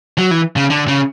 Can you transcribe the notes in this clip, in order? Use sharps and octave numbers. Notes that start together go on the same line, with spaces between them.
F#3
E3
C#3
D3
C#3